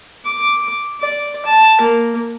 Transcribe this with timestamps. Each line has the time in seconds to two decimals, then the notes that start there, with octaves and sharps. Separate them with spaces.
0.25 D6
1.00 D5
1.45 A5
1.81 A#3